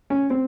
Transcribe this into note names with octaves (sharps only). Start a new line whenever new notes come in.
C#4
C4